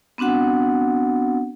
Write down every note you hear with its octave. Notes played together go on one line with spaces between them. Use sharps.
B3 C4 D4 F#4 F#5